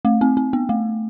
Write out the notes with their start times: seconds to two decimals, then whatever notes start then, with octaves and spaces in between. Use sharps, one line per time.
0.05 A3
0.21 C4
0.37 C4
0.53 B3
0.69 A3